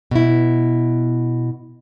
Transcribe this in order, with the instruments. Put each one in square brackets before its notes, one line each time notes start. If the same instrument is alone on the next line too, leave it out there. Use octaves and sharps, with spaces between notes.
[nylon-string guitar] B2 E4